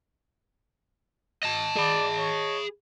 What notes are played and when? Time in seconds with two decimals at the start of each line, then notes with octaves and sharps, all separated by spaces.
1.43 D#5 A5
1.76 G#4 D5 B5
2.17 C#5